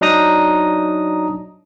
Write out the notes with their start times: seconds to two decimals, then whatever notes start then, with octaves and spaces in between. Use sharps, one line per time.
0.01 F#3 D4 D#4 A#5 D#6